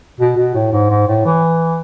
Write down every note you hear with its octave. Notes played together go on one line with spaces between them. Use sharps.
B2
B2
A2
G#2
G#2
A2
E3